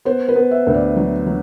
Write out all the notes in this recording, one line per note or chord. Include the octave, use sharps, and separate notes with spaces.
B3 C5
B4
B3
E5
D2
D5
F#3
F#3